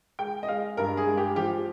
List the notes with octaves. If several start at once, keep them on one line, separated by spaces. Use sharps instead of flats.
G#3 G5
D#5
G#3 F5
G2 A#4
G#4
G#3
G4
F3 G4